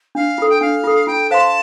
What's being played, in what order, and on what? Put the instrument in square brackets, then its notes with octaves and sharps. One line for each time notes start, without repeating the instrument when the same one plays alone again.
[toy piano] D4 [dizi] F5
[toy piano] F4 A4
[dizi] G5
[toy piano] D4 [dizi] F5
[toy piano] F4 A4
[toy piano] F4 [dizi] G5
[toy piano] C5 F5 C6 [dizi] A5